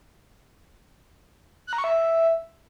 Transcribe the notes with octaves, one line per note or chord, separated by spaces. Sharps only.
F#6
A#5
C#6
E5